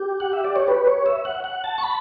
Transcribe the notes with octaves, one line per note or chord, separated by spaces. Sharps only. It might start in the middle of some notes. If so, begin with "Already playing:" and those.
Already playing: G4
F#5
E5
D5
C#5
B4
C#5
E5
F#5
F#5
A5
C#6
B5